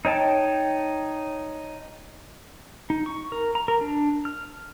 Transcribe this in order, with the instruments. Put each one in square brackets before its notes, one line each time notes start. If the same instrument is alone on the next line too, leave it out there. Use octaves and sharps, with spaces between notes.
[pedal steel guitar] D#4 C#5 G5 A5
D#4
C#6
A#4
A#5
A#4
D4
F6